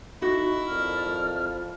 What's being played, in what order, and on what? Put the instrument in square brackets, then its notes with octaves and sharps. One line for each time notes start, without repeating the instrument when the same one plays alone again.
[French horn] D#4 [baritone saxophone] E4 [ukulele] F#4
[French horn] F2 [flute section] A#4 D5 F6